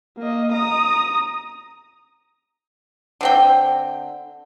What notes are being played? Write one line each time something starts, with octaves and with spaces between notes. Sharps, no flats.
A#3 D#5
A#5 D#6
D3 C4 G5